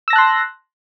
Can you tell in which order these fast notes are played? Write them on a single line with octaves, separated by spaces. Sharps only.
E6 A#6 A5 F#6 C6